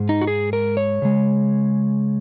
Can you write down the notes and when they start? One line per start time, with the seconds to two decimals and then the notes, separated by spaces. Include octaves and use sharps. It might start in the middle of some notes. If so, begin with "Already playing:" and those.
Already playing: G#2 G#3
0.09 D#4
0.21 F#4
0.27 G#4
0.53 A#4
0.77 C#5
1.02 C#3 G#3